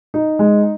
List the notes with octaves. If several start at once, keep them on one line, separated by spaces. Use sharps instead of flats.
D#4
G#3